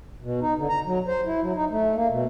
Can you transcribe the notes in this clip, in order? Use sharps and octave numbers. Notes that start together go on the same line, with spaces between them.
B2
D#4
D3
A#5
F#3
C5
E4
F#3
D#4
A3
A#3
B2